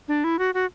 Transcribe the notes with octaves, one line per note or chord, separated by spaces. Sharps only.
D4
E4
F#4
F#4